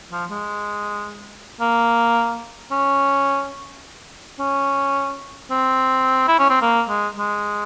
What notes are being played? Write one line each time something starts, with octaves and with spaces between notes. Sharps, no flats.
F3
G#3
A#3
C#4
C#4
C4
E4
C#4
C4
A#3
G#3
G#3